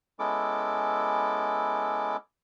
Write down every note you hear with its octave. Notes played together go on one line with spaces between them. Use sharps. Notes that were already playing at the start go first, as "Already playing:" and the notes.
G#3 B3 C#4 E4 A4 D6